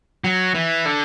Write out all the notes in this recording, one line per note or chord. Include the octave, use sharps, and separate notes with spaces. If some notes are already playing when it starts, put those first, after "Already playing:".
F#3
E3
D3